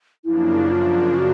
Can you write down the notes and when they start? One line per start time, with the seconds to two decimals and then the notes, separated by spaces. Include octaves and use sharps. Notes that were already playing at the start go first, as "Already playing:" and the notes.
0.24 F#2 C#3 F3 A#3 D4 E4
0.71 F4
1.18 F#4